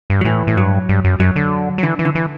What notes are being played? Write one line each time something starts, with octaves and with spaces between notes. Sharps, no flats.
G2
F#3
A2 E3
A2
G2 F#3
G2
F#2
F#2 F#3
D3
F#3
D3 E3
E3
D3
E3